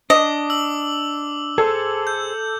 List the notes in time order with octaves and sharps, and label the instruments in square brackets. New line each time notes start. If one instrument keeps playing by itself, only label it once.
[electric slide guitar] D4 [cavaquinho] D#5 [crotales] D6
[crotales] E6 F#7
[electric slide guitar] G#4 C5 [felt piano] A4
[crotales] G6